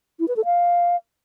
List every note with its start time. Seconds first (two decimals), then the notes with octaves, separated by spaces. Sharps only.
0.20 E4
0.28 B4
0.36 A4
0.45 F5